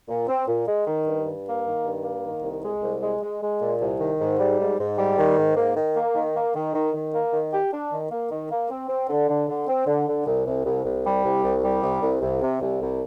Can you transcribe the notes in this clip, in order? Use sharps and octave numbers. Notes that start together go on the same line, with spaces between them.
A#2
C4
A#2
G#3
D#3
G2
G2
A#3
D#3
G2
A#3
D#3
C2
G#3
C2
G#3
G#3
G#3
A#2
C2
D#3
G#2
G3
G#2
G#2
G3
D#3
G#2
A#3
D#3
A#3
D#3
A#3
D#3
D#3
D#3
A#3
D#3
G4
D4
D#3
A#3
D#3
A#3
C4
C4
D3
D3
D3
C4
D3
D3
C2
C2
C2
C2
G3
C2
C2
G3
C2
C2
C2
C3
C2
C2